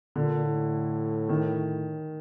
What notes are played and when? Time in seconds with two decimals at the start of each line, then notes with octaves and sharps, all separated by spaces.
0.16 A#2 D3
0.45 A2
1.29 D#3